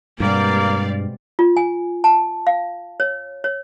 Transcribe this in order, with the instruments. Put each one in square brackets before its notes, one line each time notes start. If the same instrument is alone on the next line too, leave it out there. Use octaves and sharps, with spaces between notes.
[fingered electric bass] G2 [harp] B2 G#3 C4 [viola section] G3 D5 F5 [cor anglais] A#3
[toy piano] F4
G#5
A5
F5
C#5
C#5